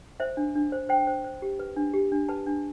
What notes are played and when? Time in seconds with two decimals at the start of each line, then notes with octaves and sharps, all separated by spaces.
0.20 C5 E5
0.37 D4
0.56 D4
0.72 C5
0.89 C5 G5
1.07 C5
1.24 C5
1.42 G4
1.59 B4
1.76 D4
1.94 G4
2.12 D4
2.29 B4 A5
2.47 D4